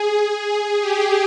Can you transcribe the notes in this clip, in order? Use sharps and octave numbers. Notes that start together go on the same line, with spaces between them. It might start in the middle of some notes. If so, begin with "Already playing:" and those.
Already playing: G#4
G#4
G4